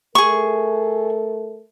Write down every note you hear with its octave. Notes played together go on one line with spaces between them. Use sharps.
A3 G#4 A#4 C#6